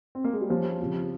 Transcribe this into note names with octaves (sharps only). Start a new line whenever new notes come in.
C4
A#3
G#3
G3
F3 A#3 C#4 G4 C5
C#3 F3 C4 G4